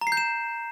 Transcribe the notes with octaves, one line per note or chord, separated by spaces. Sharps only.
A#5
C7
G6
E7